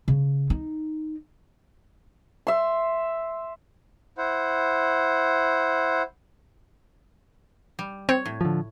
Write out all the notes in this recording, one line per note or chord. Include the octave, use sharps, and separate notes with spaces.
C#3
D#4
E5 C6
E4 C5 F#5
G3
C4 C#5
A2
D3 F3